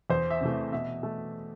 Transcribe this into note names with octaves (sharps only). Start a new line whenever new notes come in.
E2 C5
E5
C3 E3 A3
E5
B2 E5
A3